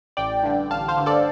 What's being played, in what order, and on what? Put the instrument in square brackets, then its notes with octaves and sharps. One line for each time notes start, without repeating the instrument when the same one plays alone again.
[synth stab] A1 D5 G5
G2 D3
A1 F5 A5
C5 F5
G2 D3
A4 D5